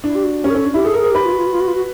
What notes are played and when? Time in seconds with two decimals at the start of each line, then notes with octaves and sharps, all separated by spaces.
0.04 D4 E4
0.15 G4
0.23 F#4
0.44 C#4 G4
0.50 A#4
0.54 C#4 A4
0.65 D4
0.74 E4 G4
0.85 G#4 A4
0.94 A#4
0.97 G#4
1.04 A#4
1.11 G4 B4
1.25 F4
1.32 F#4
1.38 F4
1.46 F#4
1.52 F4
1.60 F#4
1.67 F4
1.74 F#4